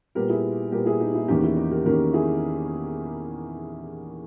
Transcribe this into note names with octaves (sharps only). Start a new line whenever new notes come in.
A#2 G3 B3 G4 A#4
E4 G#4
A#2 G3 B3 G4 A#4
E4 G#4
D#4 G4
E4
E2 D#3 A#3 C#4 D#4 G4
E4
D#4
G4 A#4
E2 D#3 A#3 C#4 G4 A#4
E4 G#4